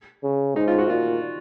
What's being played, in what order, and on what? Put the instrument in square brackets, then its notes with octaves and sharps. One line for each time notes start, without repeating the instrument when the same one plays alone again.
[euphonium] C#3
[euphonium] G#2 [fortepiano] D#4
[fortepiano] F4
F#4
[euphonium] A#2 [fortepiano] F4